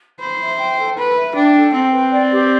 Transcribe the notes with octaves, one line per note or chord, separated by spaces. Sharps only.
C5 B5
E5
G5
A4
B4 B5
E5
D4 G5
A4
C4 G5
B4
D5
G4